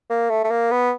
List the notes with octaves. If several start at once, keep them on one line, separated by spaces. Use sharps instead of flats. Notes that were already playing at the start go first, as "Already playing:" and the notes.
A#3
A3
A3
A#3
B3